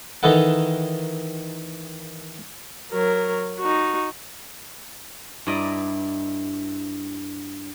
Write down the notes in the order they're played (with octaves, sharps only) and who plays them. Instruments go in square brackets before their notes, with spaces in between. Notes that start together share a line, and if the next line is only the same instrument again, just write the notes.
[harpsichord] D#3 E3 D#4 A4 F#5
[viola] F#3 A#4
D#4 F#4
[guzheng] G2 E4 D5 D#5 A#5